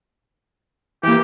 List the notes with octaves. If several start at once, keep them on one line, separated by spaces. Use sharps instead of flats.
E3 A#3 G4